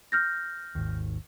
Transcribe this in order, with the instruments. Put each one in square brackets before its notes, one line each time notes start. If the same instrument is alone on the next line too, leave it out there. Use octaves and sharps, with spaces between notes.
[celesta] F6 G6 A#6
[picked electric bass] G#1 D#2